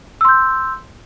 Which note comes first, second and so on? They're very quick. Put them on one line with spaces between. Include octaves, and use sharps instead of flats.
E6 C6 G6